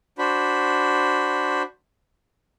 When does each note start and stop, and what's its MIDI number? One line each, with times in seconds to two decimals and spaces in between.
0.19 1.62 62
0.19 1.62 66
0.19 1.62 72
0.19 1.62 83